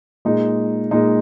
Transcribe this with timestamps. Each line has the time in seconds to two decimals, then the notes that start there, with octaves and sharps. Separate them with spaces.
0.25 A#2 G#3 D#4
0.91 A#2 G#3 D#4